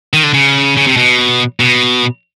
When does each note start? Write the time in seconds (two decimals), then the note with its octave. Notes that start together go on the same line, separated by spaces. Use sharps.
0.13 D#3
0.23 D3
0.33 C#3
0.77 C#3
0.87 C3
0.97 B2
1.60 B2